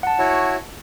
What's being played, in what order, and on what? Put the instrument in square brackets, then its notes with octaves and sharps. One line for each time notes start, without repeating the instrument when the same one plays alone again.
[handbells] F#5 A5
[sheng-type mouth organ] E4 F#4 C#5